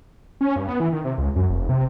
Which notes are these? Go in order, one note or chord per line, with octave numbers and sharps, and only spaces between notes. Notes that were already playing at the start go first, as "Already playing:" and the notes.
C#4
G2
B3
E3
D#3
C3
C#2
F#2
F1
C3